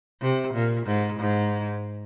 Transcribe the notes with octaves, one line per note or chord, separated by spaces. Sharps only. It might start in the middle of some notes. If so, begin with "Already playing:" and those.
C3
A#2
G#2
G#2